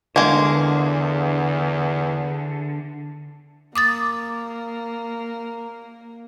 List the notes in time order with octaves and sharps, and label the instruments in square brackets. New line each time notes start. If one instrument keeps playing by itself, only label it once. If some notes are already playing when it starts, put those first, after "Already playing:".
[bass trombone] E2 [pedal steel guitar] D3 [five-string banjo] G#3 A#3
[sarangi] A#3 [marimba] D6 D#6 A6